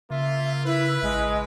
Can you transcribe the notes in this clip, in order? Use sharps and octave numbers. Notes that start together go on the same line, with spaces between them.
C#3 A#3 F4 E5
E4 B4
A1 G#3